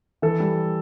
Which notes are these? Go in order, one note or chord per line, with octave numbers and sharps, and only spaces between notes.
E3 A4
G3